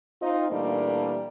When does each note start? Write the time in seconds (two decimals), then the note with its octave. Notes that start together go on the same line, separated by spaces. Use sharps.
0.21 C4 D#4 F4
0.50 A#2 E3 G3 A3 A#3 D4